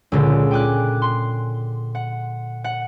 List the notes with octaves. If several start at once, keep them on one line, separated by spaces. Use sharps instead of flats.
C#2 A#2 D3
G5 G#5 D6 F#6
C6
F#5
F#5